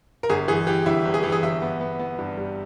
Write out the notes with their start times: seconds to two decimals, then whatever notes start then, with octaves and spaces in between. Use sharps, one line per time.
0.23 A#4
0.29 G1 G#4
0.48 E3 G#4
0.67 E3 G4
0.86 G1 E4
1.05 G1
1.14 G#4
1.23 E3 G4
1.32 G#4
1.42 G1 E5
1.62 B3
1.81 B3
1.99 B3
2.18 G2
2.37 G3